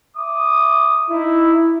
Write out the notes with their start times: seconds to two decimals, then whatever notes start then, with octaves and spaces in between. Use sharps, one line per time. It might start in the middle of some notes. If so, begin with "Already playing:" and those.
0.16 E5 D6 D#6
1.10 D#4 E4